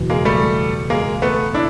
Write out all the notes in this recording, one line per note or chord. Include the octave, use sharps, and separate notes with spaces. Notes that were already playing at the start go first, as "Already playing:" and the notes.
Already playing: F#1 E2 B2
G#3 A#3
G3 A3
G#3 A#3
A3 B3
D4 E4